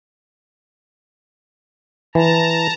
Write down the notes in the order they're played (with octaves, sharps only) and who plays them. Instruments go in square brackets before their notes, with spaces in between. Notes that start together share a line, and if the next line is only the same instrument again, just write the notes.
[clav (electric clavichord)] E3 [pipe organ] A5 A#5